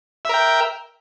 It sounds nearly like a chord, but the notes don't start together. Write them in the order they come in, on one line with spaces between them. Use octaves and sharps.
E5 A#4 G5